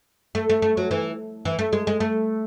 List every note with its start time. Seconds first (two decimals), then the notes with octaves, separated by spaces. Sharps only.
0.35 A3
0.49 A3
0.62 A3
0.77 F#3
0.91 E3
1.45 E3
1.59 A3
1.73 G#3
1.87 G#3
2.00 A3